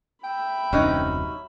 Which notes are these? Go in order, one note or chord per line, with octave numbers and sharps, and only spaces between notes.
E5 G5 B5
D#1 F#2 C3 F#3 C#4 D#4